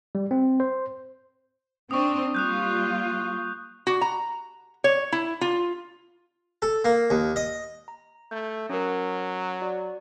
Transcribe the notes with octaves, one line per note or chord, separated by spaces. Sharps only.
G3
C4
C5
C4 D4 C#6 D#6
G3 A#3 F4 D#6 F#6 G6
F#4
A#5
C#5
E4
F4
A4
A#3
D#2
D#5
A#5
A3 G6
F#3 C#4 A#4
F#4 D5